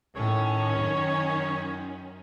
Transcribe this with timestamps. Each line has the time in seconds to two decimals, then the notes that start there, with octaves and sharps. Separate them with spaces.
0.16 A2 D#3 C#4 C#5
0.80 F#2